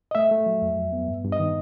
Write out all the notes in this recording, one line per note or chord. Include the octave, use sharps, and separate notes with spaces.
D#5
A3 E5
A3
F#3
F2
F2
B3
G2
G2
D#5
D#3